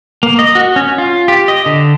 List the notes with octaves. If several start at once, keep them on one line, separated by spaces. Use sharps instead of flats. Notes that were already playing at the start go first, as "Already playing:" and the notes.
A#3
D#5
F#4
C#4
F4
G4
D#5
D3